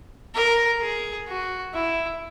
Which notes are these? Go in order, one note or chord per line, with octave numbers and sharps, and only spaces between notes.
A#4
G#4
F#4
E4